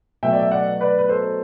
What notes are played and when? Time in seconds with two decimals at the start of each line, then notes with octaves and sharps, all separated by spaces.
0.23 B2 F#3 A3 E5 G5
0.33 D5
0.42 E5
0.51 D5 F#5
0.81 B4 D5
0.99 B4
1.09 A4 C5